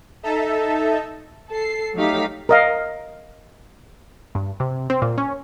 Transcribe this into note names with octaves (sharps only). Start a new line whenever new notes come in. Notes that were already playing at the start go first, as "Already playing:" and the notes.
D#4 A4 E5 A5
A4 C7
F#3 A3 D#4 G4 F5 B6
A#4 D#5 F5
G2
C3
C4
A#2
C#4